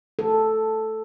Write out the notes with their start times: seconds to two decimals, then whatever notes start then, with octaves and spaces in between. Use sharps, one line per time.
0.19 A4